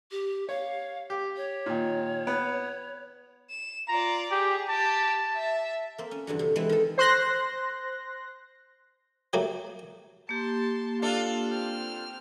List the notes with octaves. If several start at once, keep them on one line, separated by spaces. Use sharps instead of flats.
G4
C#5 F5
G4
C#5
A#2 D#3
B3
E7
F4 D5 A#5
G4 G#4
G4 A5
E5
A#3 C4
C#4
E2 G2 D3 F#3
C3
E3 G#3 A3 C4 B4
D#3 A4
C5 C6 F#6 A#6
F#3 G3 A3 A#3
A#3 G4 A5 C6
D4 F4 A4 F5
C4 F6